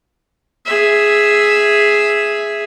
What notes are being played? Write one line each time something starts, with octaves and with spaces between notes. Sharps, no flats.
G#4 E5